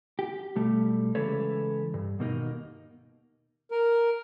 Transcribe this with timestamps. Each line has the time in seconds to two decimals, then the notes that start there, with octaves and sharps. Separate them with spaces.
0.19 G4
0.56 B1 G3 A3
1.15 C#3 E3 G#3 A4 B4 C#5
1.94 G2
2.19 D#2 B2 A#3 D#4
3.71 A#4